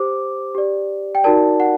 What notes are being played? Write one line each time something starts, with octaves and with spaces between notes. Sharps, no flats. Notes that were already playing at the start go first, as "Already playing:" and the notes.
Already playing: G4 C5 D6
G4 D5
G5
D#4 F#4 A#4 D5 A5
F#5